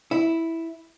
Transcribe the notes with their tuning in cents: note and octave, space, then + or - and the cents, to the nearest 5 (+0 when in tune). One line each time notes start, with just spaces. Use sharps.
E4 -5